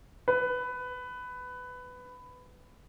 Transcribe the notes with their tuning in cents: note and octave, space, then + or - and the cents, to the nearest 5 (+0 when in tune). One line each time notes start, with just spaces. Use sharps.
B4 +15